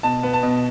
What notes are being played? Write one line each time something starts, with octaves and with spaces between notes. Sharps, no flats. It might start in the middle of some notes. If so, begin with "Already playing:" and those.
B2 A5
B3
A5
B2